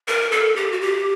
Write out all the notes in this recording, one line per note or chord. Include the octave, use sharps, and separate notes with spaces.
A#4
A4
G4
F#4
G4